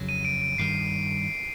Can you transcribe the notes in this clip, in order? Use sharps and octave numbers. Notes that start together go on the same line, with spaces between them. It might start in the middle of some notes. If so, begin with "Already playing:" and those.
Already playing: F2 C#3 F#3
D#7
D7
D7
G2 D#3 G3 C7